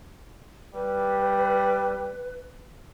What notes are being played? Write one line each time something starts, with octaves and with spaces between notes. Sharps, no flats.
G3 B4